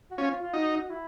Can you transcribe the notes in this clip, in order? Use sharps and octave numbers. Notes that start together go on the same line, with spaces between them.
F#4
C#4 F4
F4
F4
D#4 F#4
E4